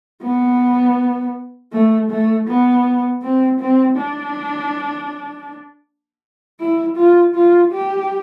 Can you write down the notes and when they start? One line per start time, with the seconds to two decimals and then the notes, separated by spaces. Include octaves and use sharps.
0.22 B3
1.73 A3
2.10 A3
2.48 B3
3.22 C4
3.60 C4
3.97 D4
6.60 E4
6.97 F4
7.35 F4
7.72 G4